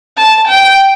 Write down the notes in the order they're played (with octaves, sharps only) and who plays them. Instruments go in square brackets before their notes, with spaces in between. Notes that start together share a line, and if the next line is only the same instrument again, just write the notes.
[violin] A5
G5